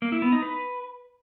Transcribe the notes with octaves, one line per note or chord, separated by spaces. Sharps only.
A#3
E4
B3
D#4
B4